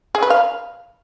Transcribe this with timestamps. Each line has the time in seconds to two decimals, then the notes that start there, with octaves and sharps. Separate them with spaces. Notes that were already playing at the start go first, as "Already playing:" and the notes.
0.15 G#4
0.23 B4
0.30 F5